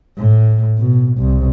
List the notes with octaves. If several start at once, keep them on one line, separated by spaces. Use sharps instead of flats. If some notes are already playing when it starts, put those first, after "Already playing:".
A2
B2
C2